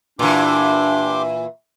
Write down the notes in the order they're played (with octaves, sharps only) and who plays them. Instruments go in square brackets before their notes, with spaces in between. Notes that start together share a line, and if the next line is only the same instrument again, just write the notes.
[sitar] A#2 E3 [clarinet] D4 [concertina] G4 C6 D6